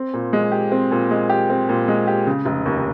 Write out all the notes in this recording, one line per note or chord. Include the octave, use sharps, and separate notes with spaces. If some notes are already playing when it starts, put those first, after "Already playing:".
Already playing: C4
A#2
G#3
G4
C4
A#2
G#3
G4
C4
A#2
G#3
G4
C#3
F1
D#2